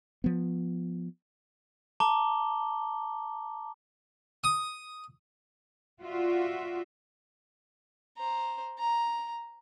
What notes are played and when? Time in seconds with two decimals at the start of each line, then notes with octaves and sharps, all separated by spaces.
0.24 F3 B3
2.00 A5 A#5 D6 G7
4.44 D#6
6.02 F4 F#4 D5 E5
8.17 C5 A#5
8.78 A#5